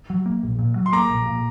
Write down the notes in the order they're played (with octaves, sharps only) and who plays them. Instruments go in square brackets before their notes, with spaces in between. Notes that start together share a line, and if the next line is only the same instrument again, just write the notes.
[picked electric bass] F#3
A#3
A#1
A#2
F#3
[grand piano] C6
[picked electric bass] A#3 [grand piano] A#5 D6
[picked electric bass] A#1
A#2